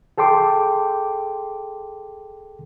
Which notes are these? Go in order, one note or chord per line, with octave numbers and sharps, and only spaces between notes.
G#4 A4 G5 C6 D6